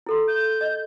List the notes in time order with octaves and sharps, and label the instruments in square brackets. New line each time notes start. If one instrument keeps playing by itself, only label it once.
[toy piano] E4 A4 C6
[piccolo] G6
[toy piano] D#5